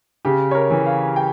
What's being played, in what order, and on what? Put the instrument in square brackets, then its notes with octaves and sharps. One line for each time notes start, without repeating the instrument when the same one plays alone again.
[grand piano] C#3 G4
C#5
A#4
E3
F5
G5